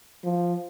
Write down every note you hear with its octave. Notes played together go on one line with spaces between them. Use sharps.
F3